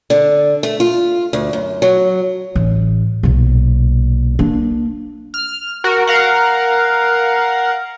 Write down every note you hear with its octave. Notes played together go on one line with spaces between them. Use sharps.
D3
A3
F4
D2
F#2
F#3
A1
B1 A#2
A#3 D4
F6
F#4 A#4
A#4 F5 F#5